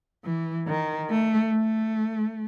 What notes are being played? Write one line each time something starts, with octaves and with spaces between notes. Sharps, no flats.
E3
D#3
A3
A3